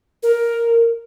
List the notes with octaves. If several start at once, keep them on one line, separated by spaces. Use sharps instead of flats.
A#4